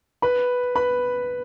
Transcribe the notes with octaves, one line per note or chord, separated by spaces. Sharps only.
B4 B5
B4 B5